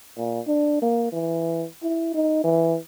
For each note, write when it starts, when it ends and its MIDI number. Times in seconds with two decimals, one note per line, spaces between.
0.17 0.40 46
0.47 0.78 62
0.82 1.08 58
1.12 1.66 52
1.83 2.11 64
2.14 2.40 63
2.44 2.78 52